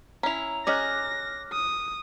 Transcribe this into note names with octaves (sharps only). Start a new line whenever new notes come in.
C#4 E4 A#5 F7
C#4 G#4 D#5 D6 F6 F#6 A#6
D#6